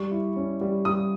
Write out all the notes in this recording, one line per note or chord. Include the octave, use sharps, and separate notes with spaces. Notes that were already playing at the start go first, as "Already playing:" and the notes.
Already playing: G3 C#6
E4
C#4
G3
G3 D#6